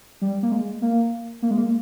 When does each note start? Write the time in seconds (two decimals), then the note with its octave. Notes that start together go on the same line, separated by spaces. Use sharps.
0.21 G3
0.43 A#3
0.52 G#3
0.82 A#3
1.42 A#3
1.51 G#3
1.58 A#3